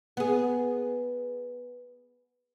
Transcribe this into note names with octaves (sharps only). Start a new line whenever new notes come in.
B3 G#4